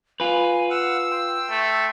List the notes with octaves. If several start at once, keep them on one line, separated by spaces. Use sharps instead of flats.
F4 B4 G#5
F5 F#5 E6
G5 C6
A3